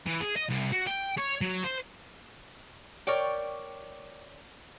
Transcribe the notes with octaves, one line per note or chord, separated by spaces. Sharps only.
E3
G#4
D#5
C2
F#4
G5
C#5
F#3
C5
A#4 C#5 D5 G5